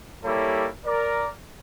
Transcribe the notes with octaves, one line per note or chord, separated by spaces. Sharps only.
G3 A#3 E4 G4 A4 C#5
A#4 D5